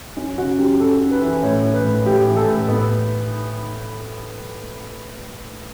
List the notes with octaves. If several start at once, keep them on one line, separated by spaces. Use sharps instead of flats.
F#2 C#4
C#3 F#4
F#2 G4
F#2 A4
F#2
B4
E3
A2 C#5
E3
B4
A2
A2 G4
E3
A4
A2
A2 B3